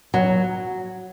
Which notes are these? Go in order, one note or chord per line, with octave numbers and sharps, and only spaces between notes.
F#3